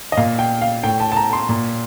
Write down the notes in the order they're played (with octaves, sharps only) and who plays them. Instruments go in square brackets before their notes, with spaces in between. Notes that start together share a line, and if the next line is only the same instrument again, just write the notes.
[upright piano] D#5
A#2 F5
G5
F5
A2 G5
A5
A5
A#5
C6
A#2